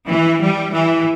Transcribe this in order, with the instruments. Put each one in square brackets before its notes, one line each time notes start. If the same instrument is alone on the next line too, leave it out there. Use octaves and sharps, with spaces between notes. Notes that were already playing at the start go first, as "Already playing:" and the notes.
[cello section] E3
G3
E3